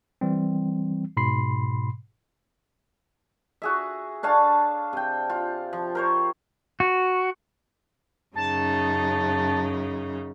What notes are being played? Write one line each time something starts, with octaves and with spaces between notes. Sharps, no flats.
E3 G3 C4
G#2 B2 B5 C6 C7
F#4 G#4 E5
D4 C#5 F5 A5
C3 G5
F4
F3
A#4 C5 C#5
F#4
F#2 C#3 D#4 A5